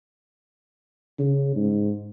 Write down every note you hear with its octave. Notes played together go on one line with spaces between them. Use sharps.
C#3
G#2